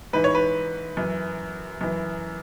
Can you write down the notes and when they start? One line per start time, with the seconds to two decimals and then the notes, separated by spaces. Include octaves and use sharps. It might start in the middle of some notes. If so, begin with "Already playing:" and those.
0.13 G#2 E3 B4
0.24 C#5
0.35 B4
0.97 F#2 E3
1.81 F#2 E3